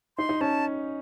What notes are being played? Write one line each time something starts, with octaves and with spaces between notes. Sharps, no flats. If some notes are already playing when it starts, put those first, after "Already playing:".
D#4 C6
D#4
C#4 A5